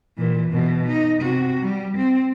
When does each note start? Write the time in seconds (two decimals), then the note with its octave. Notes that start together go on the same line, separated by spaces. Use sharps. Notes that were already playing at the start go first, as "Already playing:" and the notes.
0.18 A#2 E3
0.51 B2 E3
0.87 D#4
1.20 C3 F#4
1.60 G3
1.97 C4